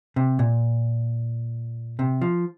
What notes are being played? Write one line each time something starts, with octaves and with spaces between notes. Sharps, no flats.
C3
A#2
C3
F3